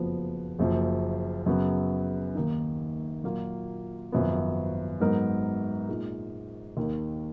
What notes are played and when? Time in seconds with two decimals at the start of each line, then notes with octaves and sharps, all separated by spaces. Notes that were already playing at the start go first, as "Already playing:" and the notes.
Already playing: F#1 F2 F3 B3 F#4
0.59 F#1 F#2 F3
1.46 F#2 C#3 F#3 B3
2.35 D#2 D#3 A#3 D#4
3.24 A#2 F#3 A#3 F4
4.12 G#1 F#2 F3 B3
5.00 G#2 F#3 B3 D#4 A#4
5.89 A#2 G#3 D#4
6.77 D#2 D#3 A#3